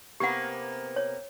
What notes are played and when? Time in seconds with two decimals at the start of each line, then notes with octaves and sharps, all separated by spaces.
0.20 C3 A#3 B3 G4 F#5
0.96 C#5